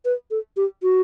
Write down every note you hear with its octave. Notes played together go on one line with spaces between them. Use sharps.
B4
A4
G4
F#4